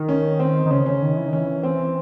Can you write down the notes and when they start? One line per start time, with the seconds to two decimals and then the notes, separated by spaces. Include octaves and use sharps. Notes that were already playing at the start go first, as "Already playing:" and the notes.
Already playing: D#3
0.09 C#4
0.39 C4
0.66 D#3
0.71 C#3 C#4
0.86 C#4
1.02 D#3
1.16 E3
1.27 D#3
1.33 C#4
1.38 E3
1.63 C4